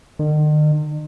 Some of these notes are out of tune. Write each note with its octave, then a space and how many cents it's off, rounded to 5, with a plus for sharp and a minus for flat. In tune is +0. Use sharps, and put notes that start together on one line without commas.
D#3 -45